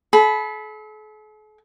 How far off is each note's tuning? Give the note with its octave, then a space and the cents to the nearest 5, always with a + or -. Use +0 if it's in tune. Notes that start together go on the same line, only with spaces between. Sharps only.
A4 -45 B5 +0